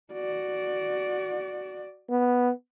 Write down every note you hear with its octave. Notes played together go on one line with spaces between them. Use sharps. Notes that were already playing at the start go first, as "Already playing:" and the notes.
F#4 D5
B3